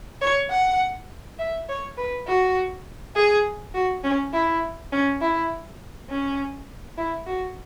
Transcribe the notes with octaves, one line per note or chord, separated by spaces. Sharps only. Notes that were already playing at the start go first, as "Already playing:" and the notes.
C#5
F#5
E5
C#5
B4
F#4
G#4
F#4
C#4
E4
C#4
E4
C#4
E4
F#4